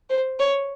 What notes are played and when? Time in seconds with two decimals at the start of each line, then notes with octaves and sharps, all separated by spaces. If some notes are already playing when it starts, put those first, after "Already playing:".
0.10 C5
0.40 C#5